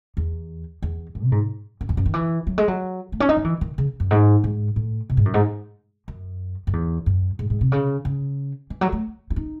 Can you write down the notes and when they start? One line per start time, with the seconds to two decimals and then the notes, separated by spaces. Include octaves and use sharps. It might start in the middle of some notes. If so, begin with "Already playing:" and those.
0.17 E2
0.82 E2
1.15 F#2
1.23 C3
1.32 G#2
1.81 F#2
1.89 E2
1.97 F#2
2.06 D#3
2.14 E3
2.47 F#3
2.58 G#3
2.68 F#3
3.12 A3
3.20 C#4
3.29 D#4
3.37 F#3
3.45 E3
3.61 D#3
3.78 C#3
4.00 F#2
4.11 G#2
4.44 G#2
4.76 A2
5.10 C3
5.17 G#2
5.25 F#2
5.34 G#2
6.08 F#2
6.67 F#2
6.73 E2
7.06 F#2
7.39 G#2
7.50 G#2
7.61 C3
7.72 C#3
8.05 C#3
8.70 E3
8.81 F#3
8.92 A3
9.30 E4
9.36 D#4